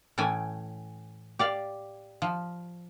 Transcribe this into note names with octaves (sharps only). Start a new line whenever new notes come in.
A2 E3 A3 C#4 G5 G#5
G4 D5 F5
F3